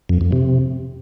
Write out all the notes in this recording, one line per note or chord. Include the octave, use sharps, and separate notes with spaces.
F2
F2
C3